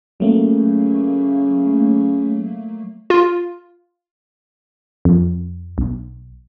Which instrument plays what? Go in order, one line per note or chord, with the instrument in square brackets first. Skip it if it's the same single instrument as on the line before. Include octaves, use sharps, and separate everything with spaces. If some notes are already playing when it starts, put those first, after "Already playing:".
[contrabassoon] C#3 [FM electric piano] F#3 A3 A#3
[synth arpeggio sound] F4
[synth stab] F2
B1